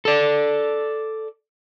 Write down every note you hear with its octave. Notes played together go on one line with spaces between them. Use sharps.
A4 D5